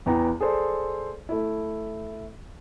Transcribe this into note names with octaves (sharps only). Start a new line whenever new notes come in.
E2 E3 B3 G5 A#5
G#4 A4 C5 D5
A3 E4